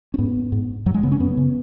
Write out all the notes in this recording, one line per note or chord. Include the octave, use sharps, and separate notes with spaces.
C#4
G#2 B3
G#2
F#2 F#3
G#3
C#3 B3
C#4
F#2 B3
C#3